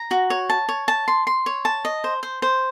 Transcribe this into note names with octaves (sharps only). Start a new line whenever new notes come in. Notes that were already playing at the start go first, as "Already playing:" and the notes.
Already playing: A#5
F#4
C#5
A5
C#5
A5
C6
C6
C#5
A5
D#5
C5
C5
C5